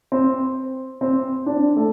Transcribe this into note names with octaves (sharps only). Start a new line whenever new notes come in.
C4
C4
D4
A3 A4